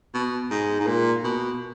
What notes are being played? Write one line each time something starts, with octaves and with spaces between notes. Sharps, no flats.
B2
G#2
G#2
A#2
B2